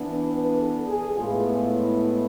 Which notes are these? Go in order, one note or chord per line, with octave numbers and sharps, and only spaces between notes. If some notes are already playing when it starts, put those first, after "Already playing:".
Already playing: E3 B3 D4
B4
A4
G#4
A2 G#3 B3 F4
E4